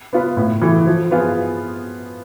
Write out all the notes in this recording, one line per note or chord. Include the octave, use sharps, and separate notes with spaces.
B3 F4 B4
A2
E3 A3
F3
B3 F4 G#4